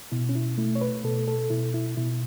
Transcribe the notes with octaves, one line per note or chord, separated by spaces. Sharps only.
B2 E4
C#4
E4
A3 E4
C#5
B4
B2 A4
A4
B2 E4
E4
B2 E4